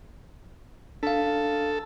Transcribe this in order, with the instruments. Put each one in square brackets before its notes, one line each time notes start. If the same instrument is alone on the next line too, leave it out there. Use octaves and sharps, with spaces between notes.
[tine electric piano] D4 F5 [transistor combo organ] A4